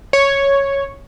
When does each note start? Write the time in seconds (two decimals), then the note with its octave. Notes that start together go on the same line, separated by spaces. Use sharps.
0.13 C#5